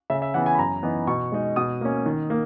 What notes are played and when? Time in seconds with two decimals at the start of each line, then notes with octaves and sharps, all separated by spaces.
0.10 C#3 E5
0.22 E5
0.34 E3 B3 F#5
0.46 G#5
0.55 B5
0.58 F#2 A#5
0.83 E3 B3 D#4
1.07 B2 C#6
1.32 G#3 D#4
1.56 B2 D#6
1.81 A#3 C#4
2.06 D#3
2.30 A#3